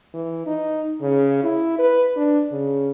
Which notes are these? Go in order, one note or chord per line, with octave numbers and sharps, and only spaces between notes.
E3
D#4
C#3
E4
B4
D4
C#3